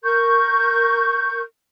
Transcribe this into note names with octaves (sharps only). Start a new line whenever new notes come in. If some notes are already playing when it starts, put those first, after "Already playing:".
A#4 C#6 G6